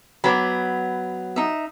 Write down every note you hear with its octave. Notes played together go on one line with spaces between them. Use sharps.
F#3 B3 B5 D6
D#4 E5